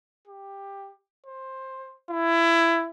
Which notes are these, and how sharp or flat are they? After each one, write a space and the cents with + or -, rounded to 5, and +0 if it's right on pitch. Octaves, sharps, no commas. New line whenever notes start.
G4 +10
C5 +15
E4 +20